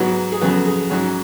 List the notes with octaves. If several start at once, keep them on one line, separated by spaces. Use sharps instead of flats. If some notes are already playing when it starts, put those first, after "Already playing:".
Already playing: G#2 F#3 B3 F#4
G#4
F2 C#3 F#3 B3 F#4
G#4
G#2 F#3 C#4 F#4